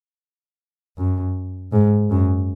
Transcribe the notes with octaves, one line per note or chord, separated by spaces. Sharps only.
F#2
G#2
F#2